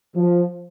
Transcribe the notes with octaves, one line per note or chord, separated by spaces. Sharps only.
F3